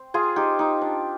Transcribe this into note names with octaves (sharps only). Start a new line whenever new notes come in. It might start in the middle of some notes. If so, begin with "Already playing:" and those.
Already playing: C4
F4 G#4
D#4 G4
D#4
D4